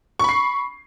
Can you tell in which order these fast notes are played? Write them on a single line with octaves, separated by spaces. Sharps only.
C#6 B5 C7